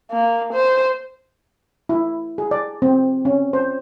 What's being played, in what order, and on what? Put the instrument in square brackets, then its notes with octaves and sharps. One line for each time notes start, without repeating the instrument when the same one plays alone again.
[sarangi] A#3
C5
[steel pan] E4
G#4
D5
C4
C#4
C5